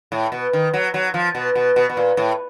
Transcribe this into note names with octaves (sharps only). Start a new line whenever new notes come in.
A2
B2
D#3
F#3
F#3
F3
B2
B2
B2
B2
A#2
A2